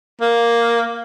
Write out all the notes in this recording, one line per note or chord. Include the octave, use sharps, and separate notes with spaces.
A#3